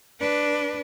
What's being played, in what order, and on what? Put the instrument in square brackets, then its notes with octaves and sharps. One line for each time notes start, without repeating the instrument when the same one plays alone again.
[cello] D4 B4